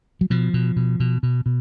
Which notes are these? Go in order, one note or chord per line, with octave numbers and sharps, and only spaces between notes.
F#3
B2 F3
B2
B2
B2
B2
B2